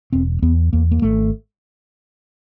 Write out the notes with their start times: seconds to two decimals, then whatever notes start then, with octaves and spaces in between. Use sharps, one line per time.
0.13 E1 C4
0.42 E2 B3
0.73 E2 A#3
0.91 A#3
1.02 G#1 A3